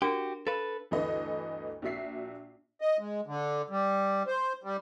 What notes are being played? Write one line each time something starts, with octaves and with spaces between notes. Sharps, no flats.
D4 F#4 G4 A#4
A4 B4 F5
G1 D2 E3 A4 B4 D#5
A#1 A#2 F#4 E5 B6 C7
D#5
G#3
D3
G3
C5
G3